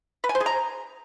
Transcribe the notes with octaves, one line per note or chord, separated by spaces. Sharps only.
B4
G#5
C5
G#4
A#5